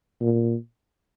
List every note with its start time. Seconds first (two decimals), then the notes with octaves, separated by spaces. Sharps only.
0.21 A#2